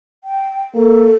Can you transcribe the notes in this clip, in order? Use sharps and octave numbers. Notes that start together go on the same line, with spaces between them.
G5
A#3 A4